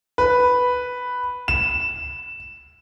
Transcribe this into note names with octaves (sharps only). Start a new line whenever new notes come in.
B4
E7